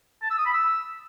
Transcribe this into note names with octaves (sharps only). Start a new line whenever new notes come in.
A5
E6
D#6
B5
E6